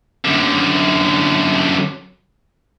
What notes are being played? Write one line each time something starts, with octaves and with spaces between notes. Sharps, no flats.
F#2 D3